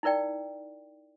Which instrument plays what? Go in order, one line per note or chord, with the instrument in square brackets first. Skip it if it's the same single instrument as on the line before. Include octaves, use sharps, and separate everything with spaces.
[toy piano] D#4 E4 A#4 D5 G5